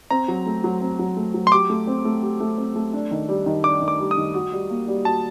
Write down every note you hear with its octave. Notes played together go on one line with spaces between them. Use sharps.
C4 A#5
F#3
A3
F#3
C4
F#3
A3
F#3
C6
G4 D6
A3
C4
A3
G4
A3
C4
A3
D4
D#3
G3
D#3
D4 D6
D#3
D6
G3
D#6
D#3
F#4
G3
A#3
G3
F#4 A5